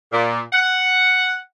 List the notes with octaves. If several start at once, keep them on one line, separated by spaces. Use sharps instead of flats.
A#2
F#5